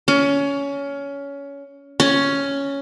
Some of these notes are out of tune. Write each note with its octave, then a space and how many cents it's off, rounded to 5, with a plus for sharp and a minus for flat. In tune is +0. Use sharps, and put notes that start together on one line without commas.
C#4 +20
C#4 +5